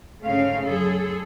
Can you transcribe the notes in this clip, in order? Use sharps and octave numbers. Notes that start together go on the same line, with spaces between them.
D2 G#2 C#3 A3 C#4 F5
F#2 G#4 A4